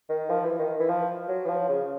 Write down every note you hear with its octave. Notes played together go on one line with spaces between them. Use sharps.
D#3
F3
E3
D#3
E3
F3
F#3
E3
F3
C#3